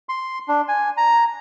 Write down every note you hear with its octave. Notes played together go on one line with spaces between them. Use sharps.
C6
D4
G#5
A#5